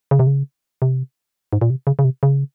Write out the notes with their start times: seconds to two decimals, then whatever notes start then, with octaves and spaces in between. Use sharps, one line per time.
0.11 C#3
0.19 C3
0.27 C#3
0.82 C3
1.53 G#2
1.61 A#2
1.70 C3
1.87 C#3
1.99 C#3
2.04 C3
2.23 C#3